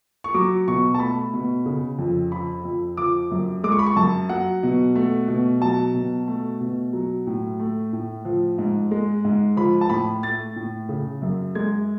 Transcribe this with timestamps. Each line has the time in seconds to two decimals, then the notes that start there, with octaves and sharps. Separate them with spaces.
0.24 C#6
0.34 F#3 D6
0.68 B2 C#6
0.94 A5
1.00 A3 B5
1.33 B2
1.66 C#3
1.98 F2
2.32 F3 B5
2.64 F2
2.97 F3 D6
3.31 F#2
3.63 G#3 D6
3.72 C#6
3.79 B5
3.86 C#6
3.96 F#2 A5
4.29 F#3 F#5
4.63 B2
4.96 A3
5.28 B2
5.61 F#3 A5
5.94 B2
6.28 A3
6.60 B2
6.93 F#3
7.27 A2
7.60 A3
7.93 A2
8.25 F3
8.58 G#2
8.91 G#3
9.24 G#2
9.57 F3 B5
9.81 A5
9.90 A2 B5
10.23 A3 A6
10.56 A2
10.89 C#3
11.22 F#2
11.55 G#3 G#6